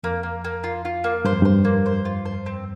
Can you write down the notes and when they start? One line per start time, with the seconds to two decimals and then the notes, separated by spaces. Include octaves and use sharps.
0.03 F2 A#3
0.23 A#3
0.44 A#3
0.64 F4
0.85 F4
1.04 A#3
1.25 G2 C5
1.33 F2
1.42 G2 C5
1.65 A#3
1.86 C5
2.05 F4
2.25 C5
2.46 C4